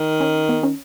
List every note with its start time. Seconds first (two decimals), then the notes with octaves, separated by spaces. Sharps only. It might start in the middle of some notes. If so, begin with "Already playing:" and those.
Already playing: D#3
0.20 C#4
0.49 B3
0.63 C#4